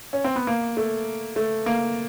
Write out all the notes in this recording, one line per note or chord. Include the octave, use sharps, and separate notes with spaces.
C#4
C4
B3
A#3
A3
A3
A#3